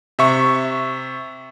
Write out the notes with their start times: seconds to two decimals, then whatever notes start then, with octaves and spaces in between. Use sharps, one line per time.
0.19 C3 E5 C#6